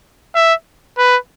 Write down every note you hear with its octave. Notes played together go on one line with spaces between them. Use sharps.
E5
B4